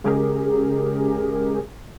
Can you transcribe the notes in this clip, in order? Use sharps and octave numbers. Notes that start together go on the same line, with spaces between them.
C#3 G#3 C#4 G4 G#4 A#4